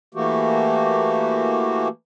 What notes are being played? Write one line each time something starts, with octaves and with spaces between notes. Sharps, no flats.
E3 A3 A#3 F#4 G4